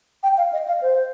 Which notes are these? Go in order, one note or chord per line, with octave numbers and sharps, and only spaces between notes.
G5
F5
D#5
F5
C5